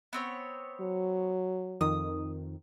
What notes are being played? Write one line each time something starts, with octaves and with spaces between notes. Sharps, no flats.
B3 C4 C#5
F#3
F2 D#3 D#6